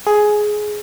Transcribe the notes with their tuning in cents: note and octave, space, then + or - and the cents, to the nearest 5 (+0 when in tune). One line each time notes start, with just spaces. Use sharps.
G#4 +10